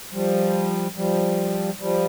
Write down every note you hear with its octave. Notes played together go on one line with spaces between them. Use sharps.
F3 G3
F3 G3
F3 G3